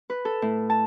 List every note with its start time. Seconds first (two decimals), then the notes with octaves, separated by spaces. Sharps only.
0.10 B4
0.25 A4
0.42 A2
0.70 A5